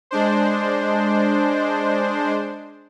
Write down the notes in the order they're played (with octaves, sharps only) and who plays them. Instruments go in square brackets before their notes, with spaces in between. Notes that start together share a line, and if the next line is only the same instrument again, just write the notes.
[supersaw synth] G#3 D4 C5